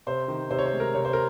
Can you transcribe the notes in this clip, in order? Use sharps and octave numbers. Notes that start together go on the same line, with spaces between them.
C3 C5
D#3
C3 C5
C#5
C5
G#3
A#4
C3 C#5
C5
A#4